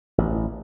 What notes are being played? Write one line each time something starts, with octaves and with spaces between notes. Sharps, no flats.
A1